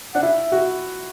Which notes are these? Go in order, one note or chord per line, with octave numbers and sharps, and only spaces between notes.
D4 F#5
E4 E5
F#4